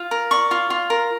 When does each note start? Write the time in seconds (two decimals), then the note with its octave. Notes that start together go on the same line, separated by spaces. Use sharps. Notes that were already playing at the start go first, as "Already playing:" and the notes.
Already playing: F4
0.11 A#4
0.31 D5 C#6
0.51 F4
0.70 F4
0.90 A#4